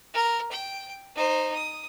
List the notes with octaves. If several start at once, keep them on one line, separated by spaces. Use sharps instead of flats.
A#4
G5
D#4 C5
D#6